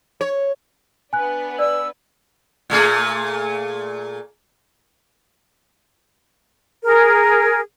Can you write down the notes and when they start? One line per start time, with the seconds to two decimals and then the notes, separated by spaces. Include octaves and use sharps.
0.21 C#5
1.13 B3 D4 B4 G#5 F#6
1.59 D5 E6
2.70 A#2 A3 G#4
6.84 G#4 A#4